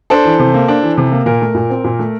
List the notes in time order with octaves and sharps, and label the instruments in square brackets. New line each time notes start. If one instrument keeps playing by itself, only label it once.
[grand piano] D4 A4 C5
E3
C3
A#3
D4
E3
C3
A#3
A#2 A#4
A3
A#2
C4
A#2
A3